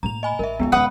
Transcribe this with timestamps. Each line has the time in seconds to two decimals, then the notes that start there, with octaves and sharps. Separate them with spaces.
0.03 A2 A#3 A#5 F7
0.23 D#5 G#5 B5
0.39 A1 A#4 E5
0.59 C#2 G#3 B3 F4
0.72 F1 C#3 B4 F#5 D#6